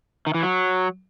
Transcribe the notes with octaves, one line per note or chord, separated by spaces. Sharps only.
D#3
E3
F#3